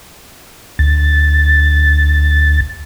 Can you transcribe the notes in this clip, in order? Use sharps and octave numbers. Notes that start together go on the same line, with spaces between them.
D2 A6